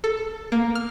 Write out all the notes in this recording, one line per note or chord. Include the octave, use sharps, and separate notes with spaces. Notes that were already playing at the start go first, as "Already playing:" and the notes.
A4
A#3
F6